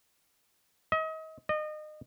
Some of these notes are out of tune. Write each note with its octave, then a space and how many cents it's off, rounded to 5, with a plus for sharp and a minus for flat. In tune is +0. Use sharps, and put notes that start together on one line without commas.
D#5 +35
D#5 -30